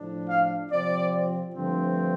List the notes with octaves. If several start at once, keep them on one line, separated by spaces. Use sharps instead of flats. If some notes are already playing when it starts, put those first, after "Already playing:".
Already playing: A2 F3 D4
F5
C3 F3 C4 D5
G2 D3 F3 A3 C4